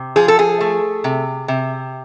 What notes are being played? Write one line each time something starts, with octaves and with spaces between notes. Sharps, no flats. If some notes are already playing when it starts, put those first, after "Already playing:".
Already playing: C3
F3 G#4
A4
G#4
A3
C3
C3